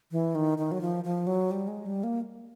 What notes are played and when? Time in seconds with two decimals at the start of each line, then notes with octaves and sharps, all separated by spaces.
0.12 E3
0.35 D#3
0.58 D#3
0.72 F#3
0.81 F3
1.04 F3
1.27 F#3
1.51 G3
1.68 G#3
1.86 G3
2.03 A#3